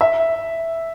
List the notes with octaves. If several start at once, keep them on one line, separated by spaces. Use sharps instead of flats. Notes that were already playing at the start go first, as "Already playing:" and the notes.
E5